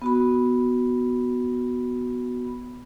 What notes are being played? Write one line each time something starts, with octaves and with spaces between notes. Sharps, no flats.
B3 F#4 B5